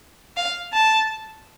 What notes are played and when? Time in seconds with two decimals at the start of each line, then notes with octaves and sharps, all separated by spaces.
0.37 F5
0.73 A5